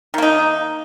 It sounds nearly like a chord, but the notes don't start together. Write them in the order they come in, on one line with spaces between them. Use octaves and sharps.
D#3 A#3 D#4